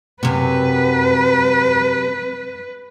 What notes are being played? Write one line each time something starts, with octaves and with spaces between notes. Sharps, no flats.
F#2 C3 B4